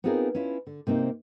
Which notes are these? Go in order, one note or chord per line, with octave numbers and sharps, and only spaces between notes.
B3 C4 D#4 F4 G#4 A#4
C#4 D4 E4 F4 B4
D3
C3 A#3 C4 D#4